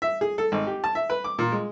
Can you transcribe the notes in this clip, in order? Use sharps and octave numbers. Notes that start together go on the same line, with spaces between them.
E5
G#4
A4
G#1
G4
A5
E5
B4
D6
A#2
G#3